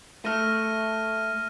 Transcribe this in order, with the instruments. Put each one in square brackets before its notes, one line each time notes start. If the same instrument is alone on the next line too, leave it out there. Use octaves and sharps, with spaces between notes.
[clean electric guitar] A3 [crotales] F6 A#6 D#7